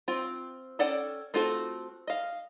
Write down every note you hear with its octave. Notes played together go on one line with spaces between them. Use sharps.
C4 F4 G5
C#4 A4 D5 F#5 G5
A3 C4 F4 F#4 A4
D#5 F5